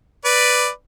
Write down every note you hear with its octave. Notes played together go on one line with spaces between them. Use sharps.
B4 D5